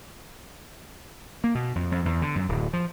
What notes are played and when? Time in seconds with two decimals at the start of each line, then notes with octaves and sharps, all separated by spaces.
1.44 A#3
1.55 B2
1.75 F2
1.92 F2
2.05 E2
2.22 D3
2.35 F#2
2.49 D1
2.73 F3